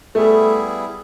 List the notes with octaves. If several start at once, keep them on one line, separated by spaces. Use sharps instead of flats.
G3 A3 B3 E4 G#4